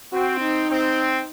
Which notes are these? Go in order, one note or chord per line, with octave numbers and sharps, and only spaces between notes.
C4 F#4
D#4
C4